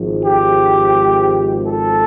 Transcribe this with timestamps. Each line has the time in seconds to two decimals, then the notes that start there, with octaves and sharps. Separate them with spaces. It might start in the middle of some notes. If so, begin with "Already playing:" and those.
Already playing: G#1 G#2 F3
0.25 G4
1.67 A4